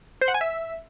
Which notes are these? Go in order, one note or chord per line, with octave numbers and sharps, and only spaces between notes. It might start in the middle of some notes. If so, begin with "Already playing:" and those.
C5
F#5
G#5
E5